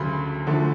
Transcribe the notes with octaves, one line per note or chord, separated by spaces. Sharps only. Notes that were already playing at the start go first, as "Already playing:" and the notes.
Already playing: D2 C#3 F#3 A3 B5 C6
D2 D3 F3 A3